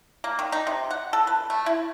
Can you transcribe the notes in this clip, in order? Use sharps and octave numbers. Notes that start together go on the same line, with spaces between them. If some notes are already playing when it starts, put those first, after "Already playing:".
A#3
D#3
D#4
C3
F#5
A4
B4
A3
E4